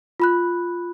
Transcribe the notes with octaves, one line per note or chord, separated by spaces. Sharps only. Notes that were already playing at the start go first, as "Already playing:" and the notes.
F4 B5 F#6